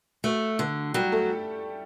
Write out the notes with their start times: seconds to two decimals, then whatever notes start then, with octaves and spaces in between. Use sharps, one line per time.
0.24 A3 F#4
0.59 D3
0.94 F#3 G3 G4
1.12 A3 A4